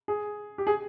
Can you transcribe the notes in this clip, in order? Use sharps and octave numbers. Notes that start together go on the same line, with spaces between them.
G#4
G4
G#4